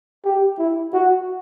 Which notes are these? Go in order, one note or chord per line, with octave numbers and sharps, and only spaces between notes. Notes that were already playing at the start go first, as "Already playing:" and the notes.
G4
E4
F#4